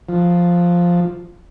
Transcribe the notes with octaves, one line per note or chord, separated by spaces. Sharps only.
F3